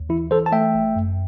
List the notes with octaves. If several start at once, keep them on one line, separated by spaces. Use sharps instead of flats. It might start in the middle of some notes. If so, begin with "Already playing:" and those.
Already playing: D#2
E3 E4
E3 A4 C5
A5
A3 E5 G5
G1
F#2